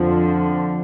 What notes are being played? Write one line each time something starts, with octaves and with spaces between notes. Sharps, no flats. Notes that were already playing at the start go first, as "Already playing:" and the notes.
Already playing: F2 D3 F3